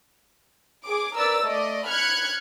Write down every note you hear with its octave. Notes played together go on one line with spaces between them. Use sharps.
G#4 D6
A#4 B4 D5 E6 A6
A3 D5 D#5
B5 F6 F#6 G#6 C#7